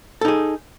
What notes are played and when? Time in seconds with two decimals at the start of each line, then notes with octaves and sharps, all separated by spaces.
0.21 A4
0.25 D#4
0.28 G#4